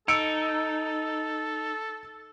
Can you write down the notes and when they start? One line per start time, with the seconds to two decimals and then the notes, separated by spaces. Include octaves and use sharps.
0.08 D#4 A4 E6 C#7 D7